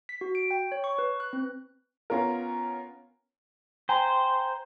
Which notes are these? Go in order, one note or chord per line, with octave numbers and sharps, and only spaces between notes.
B6
F#4
D7
G5
C#5
C#6
B4
F#6
C4
B3 C#4 F4 A#4
C5 G5 G#5 A#5